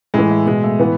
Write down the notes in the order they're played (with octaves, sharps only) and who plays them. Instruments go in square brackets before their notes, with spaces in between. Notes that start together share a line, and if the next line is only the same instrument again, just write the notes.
[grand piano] A2 E3 G#3
A3
B2 G#3
A3
A2 E3 B3